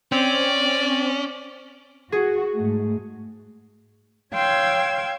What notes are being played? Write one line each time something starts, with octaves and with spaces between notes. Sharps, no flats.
C4 C#4 D5
F#4 G#4
G#2 A3
C#5 F5 G5 C6 E6 G#6